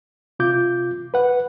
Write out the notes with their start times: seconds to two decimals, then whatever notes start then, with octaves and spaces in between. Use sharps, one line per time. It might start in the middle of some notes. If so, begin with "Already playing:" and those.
0.39 C3 F4 D6 G6
1.14 B4 F#5